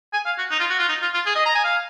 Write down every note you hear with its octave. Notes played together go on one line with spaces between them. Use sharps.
G#5
F5
F#4
D#4
F4
F#4
F4
D#4
F4
F4
G#4
D#5
A#5
G#5
F5